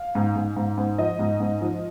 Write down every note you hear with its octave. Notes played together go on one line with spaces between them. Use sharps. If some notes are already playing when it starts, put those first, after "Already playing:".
Already playing: F5
G#2
G#2
G#2
G#2
F3 D#5
G#2
G#2
F3